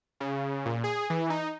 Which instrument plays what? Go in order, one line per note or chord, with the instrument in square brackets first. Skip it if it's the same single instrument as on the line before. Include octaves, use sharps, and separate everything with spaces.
[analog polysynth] C#3
A#2
G#4
E3
D#4